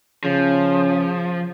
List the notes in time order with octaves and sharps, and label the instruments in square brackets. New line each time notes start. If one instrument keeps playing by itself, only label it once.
[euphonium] C#3 [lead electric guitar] F3